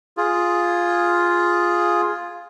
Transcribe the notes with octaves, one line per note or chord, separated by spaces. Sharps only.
F4 G#4